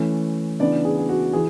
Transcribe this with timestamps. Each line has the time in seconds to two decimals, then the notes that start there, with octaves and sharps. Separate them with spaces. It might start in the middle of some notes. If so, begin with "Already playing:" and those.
Already playing: E3 A3 C#4
0.60 C#3 E3 B3 D4 D5
0.85 G#4
0.98 G#4
1.09 F#4
1.33 E3 G#4